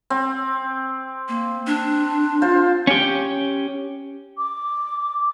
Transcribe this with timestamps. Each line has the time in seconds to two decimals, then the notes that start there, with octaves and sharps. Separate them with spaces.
0.10 C4
1.28 A#3
1.67 D4
2.42 F4 C5
2.87 C#4 G4
4.38 D6